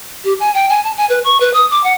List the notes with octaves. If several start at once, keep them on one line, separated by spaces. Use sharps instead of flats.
G4
G#5
G5
G#5
A5
G#5
B4
C#6
B4
D#6
D6
F#5